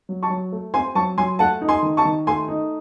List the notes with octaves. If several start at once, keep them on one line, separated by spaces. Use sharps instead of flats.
F#3
A5 C#6
F#3
A3
C4 G#5 C6
F#3 A5 C#6
F#3 G#5 C6
A3 F#5 A5
D#4
G#5 C6
D#3
A5 C#6
D#3
A3 G#5 C6
D#4